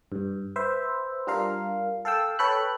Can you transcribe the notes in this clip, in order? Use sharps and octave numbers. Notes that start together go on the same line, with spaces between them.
G2
B4 C5 E5
G3 D4 F4 A#4 F5
A4 F5 G5 E6
A4 B4 C#5 G5 B5 F#6